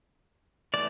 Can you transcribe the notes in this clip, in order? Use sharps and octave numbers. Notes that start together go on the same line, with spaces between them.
E3 A3 D5